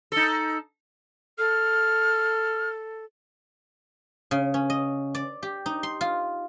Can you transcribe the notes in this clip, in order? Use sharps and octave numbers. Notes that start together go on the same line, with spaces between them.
D#4 A4
A4 F6
C#3
C#4
D#5
D5
G4
D#4
C6
F4